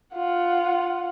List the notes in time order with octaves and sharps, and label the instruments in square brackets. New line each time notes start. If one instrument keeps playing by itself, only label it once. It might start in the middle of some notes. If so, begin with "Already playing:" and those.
[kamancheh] F4 F#5